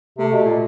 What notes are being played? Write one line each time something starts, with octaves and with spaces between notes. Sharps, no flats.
C3 A3
B2
A#2